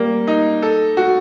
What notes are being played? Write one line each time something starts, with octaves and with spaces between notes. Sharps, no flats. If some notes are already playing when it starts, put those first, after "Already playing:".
Already playing: G3 A#3
D#4
A4
F#4